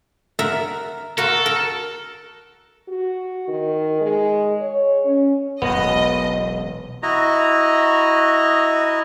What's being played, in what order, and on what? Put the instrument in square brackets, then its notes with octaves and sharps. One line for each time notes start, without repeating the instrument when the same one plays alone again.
[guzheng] A#4 E5 F#5
[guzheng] F#4 A#4 [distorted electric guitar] A4
[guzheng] A#4
[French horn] F#4
D#3
G#3
C#5
C#4
[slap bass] E1 B1 [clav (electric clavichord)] B3 [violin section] D#5
[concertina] E4 F#4 D#5 A#5